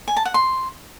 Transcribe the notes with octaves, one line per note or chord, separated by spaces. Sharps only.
G#5
A5
F#5
C6